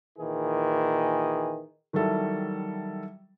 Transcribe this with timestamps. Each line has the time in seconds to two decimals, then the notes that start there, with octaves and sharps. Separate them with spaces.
0.17 A#2 D#3 E3 G#4
1.93 D#3 F#3 G3 E4 A4